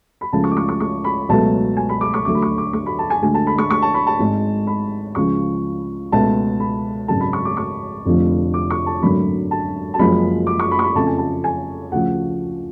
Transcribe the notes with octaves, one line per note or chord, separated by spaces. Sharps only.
B5
C#2 C#3 F3 A3 A5
C#6
D6
C#6
C#6
C#6
B5
C#2 B2 F#3 A3 A5
G#5
B5
D6
C#6
D2 D3 F#3 A3 D6
B5
C#6
D6
C#6
B5
A5
G#5
D2 D3 G#3 G#5
A5
B5
C#6
C#6
A5
B5
A5
G#1 G#2 G#3
B5
C#2 C#3 F3 C#6
C#2 B2 A3 A5
B5
G#1 F#2 C#3 G#3 A5
B5
C#6
D6
C#6
F1 F2 D3 F3
D6
C#6
A5
G#1 F#2 D3 F#3 A3 B5
A5
A5
F#1 F#2 F3 G#3 B5
D6
C#6
B5
C#6
B5
F2 C#3 F3 A3 A5
G#5
A5
G#5
D2 C#3 F3 F#5